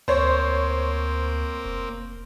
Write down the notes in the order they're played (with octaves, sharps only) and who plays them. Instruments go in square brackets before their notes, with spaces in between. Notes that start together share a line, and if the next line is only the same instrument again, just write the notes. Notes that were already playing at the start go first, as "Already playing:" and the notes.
[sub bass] D2 [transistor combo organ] A#3 C4 [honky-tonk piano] C5 C#5
[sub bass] F1